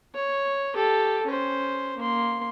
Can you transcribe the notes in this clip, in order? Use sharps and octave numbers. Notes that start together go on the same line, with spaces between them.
C#5
G4 A4
C#4 C5
A#3 C6